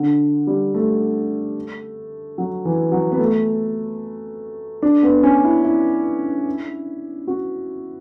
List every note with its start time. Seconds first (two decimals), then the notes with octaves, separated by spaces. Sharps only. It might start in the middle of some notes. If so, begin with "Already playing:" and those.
Already playing: D3
0.47 G3
0.74 A3
2.38 F#3
2.65 E3
2.92 F#3
3.12 B3
3.19 A3
4.82 D4
5.03 B3
5.23 C#4
5.44 E4
5.64 E4
7.27 F#4